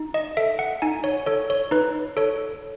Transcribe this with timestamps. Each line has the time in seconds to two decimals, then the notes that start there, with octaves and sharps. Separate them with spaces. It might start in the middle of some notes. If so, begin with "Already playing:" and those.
Already playing: D#4
0.14 D#5
0.37 A4 E5
0.59 F#5
0.82 D#4 G#5
1.04 C#5
1.26 A4 C#5
1.50 C#5
1.71 D#4 B4
2.17 A4 C#5